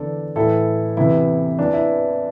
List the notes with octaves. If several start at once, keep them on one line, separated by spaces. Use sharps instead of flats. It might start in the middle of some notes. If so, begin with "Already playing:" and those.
Already playing: E2 D3 A4 D5
A2 E3 E4 A4
E2 C3 E3 E4
E2 E3 D4
E4